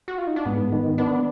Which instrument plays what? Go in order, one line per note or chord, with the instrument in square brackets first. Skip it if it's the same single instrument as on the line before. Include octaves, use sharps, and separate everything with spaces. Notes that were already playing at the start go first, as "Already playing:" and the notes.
[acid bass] F#4
F4
D#4
D4
[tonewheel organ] G#2 [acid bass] B3
[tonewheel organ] D#3
[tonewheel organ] B3 [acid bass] D4